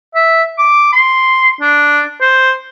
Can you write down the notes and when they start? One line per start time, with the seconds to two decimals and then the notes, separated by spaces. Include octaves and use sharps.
0.15 E5
0.58 D6
0.93 C6
1.61 D4
2.21 C5